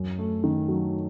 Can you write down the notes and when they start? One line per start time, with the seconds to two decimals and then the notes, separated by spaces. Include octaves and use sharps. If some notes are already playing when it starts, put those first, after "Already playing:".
Already playing: F#2
0.18 A3
0.44 D#3
0.68 F#3